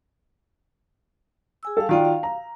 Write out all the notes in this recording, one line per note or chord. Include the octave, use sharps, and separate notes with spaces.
G#4 G#5 E6
G3 A4 F5
D#3 F4 F#4 D5 G5
F5
A#5